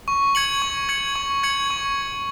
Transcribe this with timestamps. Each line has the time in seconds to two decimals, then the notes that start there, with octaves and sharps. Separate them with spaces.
0.08 C#6
0.35 G#6 C#7 F#7
0.62 C#6
0.89 G#6 C#7 F#7
1.16 C#6
1.43 G#6 C#7 F#7
1.70 C#6